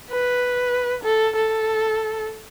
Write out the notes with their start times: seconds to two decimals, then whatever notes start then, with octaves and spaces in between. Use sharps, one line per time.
0.10 B4
1.03 A4
1.36 A4